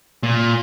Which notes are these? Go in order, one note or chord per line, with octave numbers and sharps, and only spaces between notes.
A#2